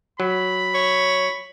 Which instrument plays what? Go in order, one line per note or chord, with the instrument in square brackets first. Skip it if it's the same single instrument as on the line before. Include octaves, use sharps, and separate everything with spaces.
[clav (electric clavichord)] F#3 [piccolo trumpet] B5
[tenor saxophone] C#5